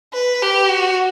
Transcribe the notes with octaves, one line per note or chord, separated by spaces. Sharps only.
B4
G4
F#4